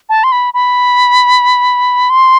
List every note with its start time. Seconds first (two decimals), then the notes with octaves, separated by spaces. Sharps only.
0.09 A5
0.24 C6
0.32 B5
0.54 B5
2.10 C6